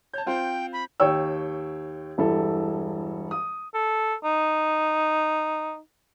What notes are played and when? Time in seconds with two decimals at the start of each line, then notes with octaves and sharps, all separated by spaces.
0.14 C#5 A5 G6
0.26 C4 F4 C5 G5
0.73 B5
1.00 D#2 C#5 G5 E6
2.18 E1 G2 E4 A4
3.31 D#6
3.74 A4
4.24 D#4